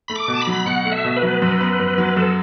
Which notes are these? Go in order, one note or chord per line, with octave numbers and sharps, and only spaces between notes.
A3 B5
D6
B2
A5
B5
F#3
B2 F#5
A3
E5
B2
B4
F#3
F#2
B3
F#2
F#3
F#2 A4